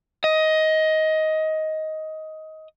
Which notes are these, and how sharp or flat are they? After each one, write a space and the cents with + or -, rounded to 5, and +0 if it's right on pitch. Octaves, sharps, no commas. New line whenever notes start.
D#5 +15